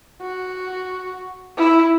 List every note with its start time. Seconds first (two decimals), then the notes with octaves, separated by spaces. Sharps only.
0.21 F#4
1.57 E4